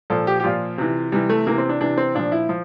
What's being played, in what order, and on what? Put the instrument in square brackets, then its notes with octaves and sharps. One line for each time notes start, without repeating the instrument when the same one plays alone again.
[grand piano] A#2 F3 A4
G4
G4
A#2 F3 F4
C3 E3
C3 E3 G3
A3
C3 E3 A#3
C4
D4
C3 E3 D4
C4
A#2 F3 D4
E4
F3